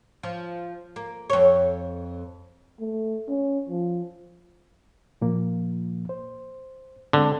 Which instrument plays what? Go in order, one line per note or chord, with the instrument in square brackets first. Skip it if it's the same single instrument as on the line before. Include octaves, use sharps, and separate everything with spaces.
[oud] F3
A#3
F2 C#5
[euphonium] A3
C#4
F3
[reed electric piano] A#2 F3 A#3
C5
[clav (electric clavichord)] D3 [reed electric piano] G#3 C4 D4